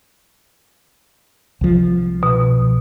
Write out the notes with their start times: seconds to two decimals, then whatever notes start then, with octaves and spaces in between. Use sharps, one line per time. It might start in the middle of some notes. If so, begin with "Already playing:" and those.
1.61 C2 F3
2.23 B2